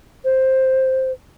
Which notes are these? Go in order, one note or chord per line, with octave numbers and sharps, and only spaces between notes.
C5